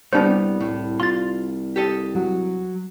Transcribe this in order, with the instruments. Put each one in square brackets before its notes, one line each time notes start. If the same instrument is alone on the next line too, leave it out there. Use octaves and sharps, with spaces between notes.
[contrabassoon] C2 [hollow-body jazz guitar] G3 B3 [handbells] C4 D4 C5 [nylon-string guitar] D5
[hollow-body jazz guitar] A2
[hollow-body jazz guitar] F4 [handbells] C6 A6
[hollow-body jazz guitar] G4 A4 D#5
[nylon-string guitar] F#3